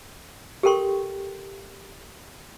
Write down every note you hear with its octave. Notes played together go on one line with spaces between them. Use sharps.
G4 A4 A#4 G5 C6 C#6